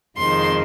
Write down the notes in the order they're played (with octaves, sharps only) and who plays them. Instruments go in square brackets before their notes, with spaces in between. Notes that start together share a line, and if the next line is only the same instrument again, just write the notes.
[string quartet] F2 C3 D#3 G#3 C6